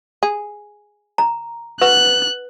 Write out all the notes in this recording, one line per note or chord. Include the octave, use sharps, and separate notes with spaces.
G#4
A#5
F#4 B4 F#6